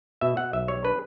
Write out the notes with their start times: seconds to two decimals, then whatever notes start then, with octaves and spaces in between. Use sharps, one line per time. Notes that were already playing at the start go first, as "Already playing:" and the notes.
0.21 B2 E5
0.37 B2 F#5
0.53 B1 E5
0.68 G3 C#5
0.84 D4 B4